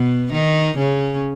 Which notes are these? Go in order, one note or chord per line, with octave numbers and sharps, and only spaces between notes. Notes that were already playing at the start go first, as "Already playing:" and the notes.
Already playing: B2 B3
D#3 D#4
C#3 C#4